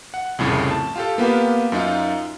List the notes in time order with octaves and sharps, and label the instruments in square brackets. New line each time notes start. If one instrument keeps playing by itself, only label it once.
[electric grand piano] F#5
C2 F2 A2 C#3
A5
F4 G4 A4
A#3 B3 F4 G4 B4
F#2 D#4 F4